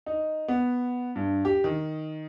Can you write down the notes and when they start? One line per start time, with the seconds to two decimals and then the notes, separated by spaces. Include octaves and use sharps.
0.06 D#4
0.48 B3
1.16 G2
1.45 G4
1.64 D#3